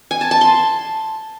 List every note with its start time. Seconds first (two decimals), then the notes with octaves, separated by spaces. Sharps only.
0.11 G#5
0.21 A5
0.31 A5
0.41 C6